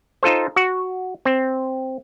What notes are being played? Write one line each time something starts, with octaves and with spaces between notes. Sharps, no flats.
D#4 F4 A4 C5
F#4 F#5
C4